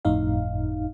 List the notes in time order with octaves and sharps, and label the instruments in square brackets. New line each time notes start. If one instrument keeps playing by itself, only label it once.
[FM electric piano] G1 F2 A2 D#4 F5